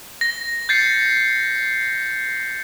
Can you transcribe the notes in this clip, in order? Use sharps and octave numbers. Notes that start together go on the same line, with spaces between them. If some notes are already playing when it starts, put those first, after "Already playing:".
A#6
G6 A6 C7 C#7